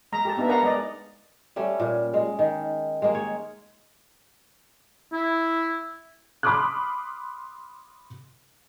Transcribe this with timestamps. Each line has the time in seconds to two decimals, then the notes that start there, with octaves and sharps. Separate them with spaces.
0.12 G#3 A#5
0.25 G4 A4 A5
0.37 B3 D4 D#4 E5 A#5
0.49 A#4 B4 F5 F#5 A#5
0.63 G#3 D5 D#5
1.56 G3 A3 C#4
1.80 A#2
2.14 G#3
2.39 D#3
3.02 G#3 A#3
3.15 C#5
5.13 E4
6.43 B5 C6 D6 D#6 F6 F#6